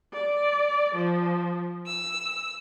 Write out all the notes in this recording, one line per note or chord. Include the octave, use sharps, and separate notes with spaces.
D5
F3
E6